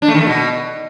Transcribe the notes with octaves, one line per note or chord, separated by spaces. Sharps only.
D4
A3
D#3
A3
B2